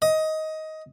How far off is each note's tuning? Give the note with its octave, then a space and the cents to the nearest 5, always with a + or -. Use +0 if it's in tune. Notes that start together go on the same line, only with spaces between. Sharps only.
D#5 +15